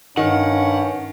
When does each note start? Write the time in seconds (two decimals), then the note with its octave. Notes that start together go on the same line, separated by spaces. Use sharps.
0.17 G2 D#3 C#4 F#5